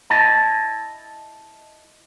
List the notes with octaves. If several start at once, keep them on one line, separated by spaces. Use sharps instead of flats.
E4 D#5 A5